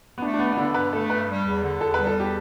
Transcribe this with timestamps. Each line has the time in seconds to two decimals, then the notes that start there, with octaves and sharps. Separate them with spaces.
0.18 B3
0.22 A3 D4
0.34 D4
0.39 G2 B3
0.52 B3
0.56 D3 D4
0.74 G2 B4
0.92 A3 A4
1.10 G2 B4
1.27 G3
1.45 E2
1.62 D3
1.81 E2 A4
1.94 G3 B4
2.07 A4
2.15 E2 G4